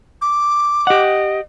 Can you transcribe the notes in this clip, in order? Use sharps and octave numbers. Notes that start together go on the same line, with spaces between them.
D6
G4 D#5 F#5